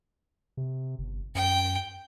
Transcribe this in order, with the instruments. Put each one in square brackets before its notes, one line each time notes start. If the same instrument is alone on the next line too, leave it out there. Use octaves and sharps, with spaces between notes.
[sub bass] C3
G1
[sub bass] F#2 [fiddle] G5